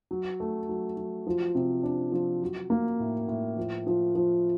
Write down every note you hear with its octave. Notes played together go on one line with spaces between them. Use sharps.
F#3
A3
F#3
F#3
F3
C3
D4
F3
F#3
A#3
A2
A2
F3
F3
F3